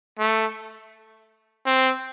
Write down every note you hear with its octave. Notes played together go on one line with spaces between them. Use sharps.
A3
C4